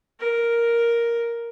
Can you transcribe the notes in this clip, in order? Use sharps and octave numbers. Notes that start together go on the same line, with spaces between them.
A#4